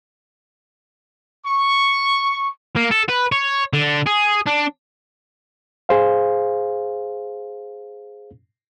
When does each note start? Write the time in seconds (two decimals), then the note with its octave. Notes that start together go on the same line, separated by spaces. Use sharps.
1.45 C#6
2.76 A#3
2.91 A4
3.09 B4
3.32 C#5
3.73 D3
4.07 G#4
4.47 D4
5.89 G#4 C5 F5